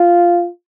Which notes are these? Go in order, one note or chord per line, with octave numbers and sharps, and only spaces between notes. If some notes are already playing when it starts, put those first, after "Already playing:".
Already playing: F4